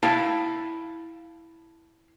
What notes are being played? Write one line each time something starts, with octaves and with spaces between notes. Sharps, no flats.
E4 F5 G5 A5